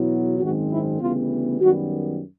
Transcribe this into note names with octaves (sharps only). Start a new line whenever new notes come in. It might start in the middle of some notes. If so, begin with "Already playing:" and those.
Already playing: E2 B2 F#3 B3 E4
G#1 F#2 D#3 G#3 C4 F#4
E4
D2 C#3 E3 G3 B3 F4
F#2 D#3 G3 B3 F#4